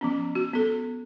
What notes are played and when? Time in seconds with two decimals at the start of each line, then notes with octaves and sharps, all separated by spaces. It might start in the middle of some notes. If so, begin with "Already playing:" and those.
0.01 F3 B3 C#4
0.35 F#4
0.53 B3 A4